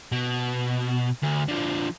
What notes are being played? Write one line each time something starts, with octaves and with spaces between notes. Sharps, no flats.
B2
D2
D3 F3